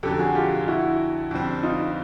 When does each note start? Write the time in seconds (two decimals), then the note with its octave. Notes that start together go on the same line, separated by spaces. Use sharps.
0.03 F2 D3 F#3 G4 A4
0.19 F#4 G#4
0.35 F4 G4
0.67 E4 F#4
1.31 F2 D3 G3 C4
1.63 D#4 F4